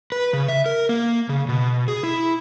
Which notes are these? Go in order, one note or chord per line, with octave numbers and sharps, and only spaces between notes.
B4
C#3
E5
A#4
A#3
C#3
B2
G#4
E4